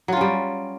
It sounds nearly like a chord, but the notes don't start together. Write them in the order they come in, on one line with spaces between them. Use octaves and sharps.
F#3 F4 C#4 G3